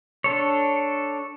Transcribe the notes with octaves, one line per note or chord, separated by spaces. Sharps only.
D4 A4 C#5